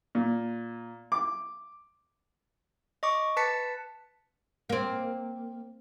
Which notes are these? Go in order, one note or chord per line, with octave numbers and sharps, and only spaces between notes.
A#2
D6
D#5 C#6 D6
B4 A5 A6 B6 C#7
A#3 C4